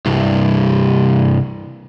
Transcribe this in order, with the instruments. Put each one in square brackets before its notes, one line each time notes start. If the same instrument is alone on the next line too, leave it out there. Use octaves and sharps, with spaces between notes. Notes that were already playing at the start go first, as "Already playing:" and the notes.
[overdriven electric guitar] C2 G2